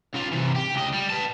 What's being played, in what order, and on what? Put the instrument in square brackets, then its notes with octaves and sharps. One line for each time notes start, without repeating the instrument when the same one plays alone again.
[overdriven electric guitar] C#3 F4
C3 E3
G4
C#2 D#5
G3
B4 A5